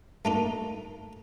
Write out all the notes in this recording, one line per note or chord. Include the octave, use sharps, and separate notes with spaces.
A3 A#3 D#4